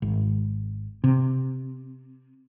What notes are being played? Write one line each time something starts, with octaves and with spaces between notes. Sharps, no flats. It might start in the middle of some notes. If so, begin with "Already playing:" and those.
G#1
C3